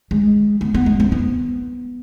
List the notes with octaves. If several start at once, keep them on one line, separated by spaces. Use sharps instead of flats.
G#3
B3
B3
G#3
C4
B3